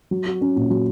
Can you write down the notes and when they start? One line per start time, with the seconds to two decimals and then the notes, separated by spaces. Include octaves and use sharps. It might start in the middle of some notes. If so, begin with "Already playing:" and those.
0.11 F#3
0.26 F#4
0.41 C#4
0.56 A#2
0.70 F#3